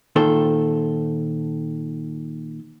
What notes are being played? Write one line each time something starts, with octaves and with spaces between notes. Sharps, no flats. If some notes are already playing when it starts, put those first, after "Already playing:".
A#2 D#3 A4 C5